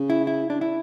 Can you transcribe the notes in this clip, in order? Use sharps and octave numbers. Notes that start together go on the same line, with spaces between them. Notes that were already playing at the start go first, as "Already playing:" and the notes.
Already playing: C#3
E4
E4
D4
E4